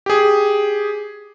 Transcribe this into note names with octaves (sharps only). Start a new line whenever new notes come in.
G4 G#4